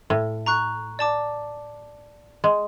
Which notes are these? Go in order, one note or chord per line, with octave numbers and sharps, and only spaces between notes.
A2
A#5 C#6 F#6
D5 A5 D6
G#3